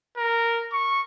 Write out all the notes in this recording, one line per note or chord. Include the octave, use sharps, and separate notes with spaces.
A#4
C#6